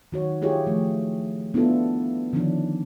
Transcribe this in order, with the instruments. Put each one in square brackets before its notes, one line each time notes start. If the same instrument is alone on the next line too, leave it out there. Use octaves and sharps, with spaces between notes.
[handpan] D#3 F#4 C#5
E4 F4 G4 G#4 C#5
F3 A3
B3 D4 E4 F4 A4
D3 D#3 F3 C#4 D4